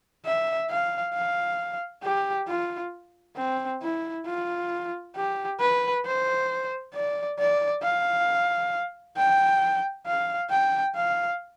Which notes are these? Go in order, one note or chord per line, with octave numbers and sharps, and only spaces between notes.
E5
F5
F5
G4
F4
C4
E4
F4
G4
B4
C5
D5
D5
F5
G5
F5
G5
F5